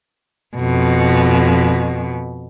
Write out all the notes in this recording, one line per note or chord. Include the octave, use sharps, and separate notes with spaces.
F2 B2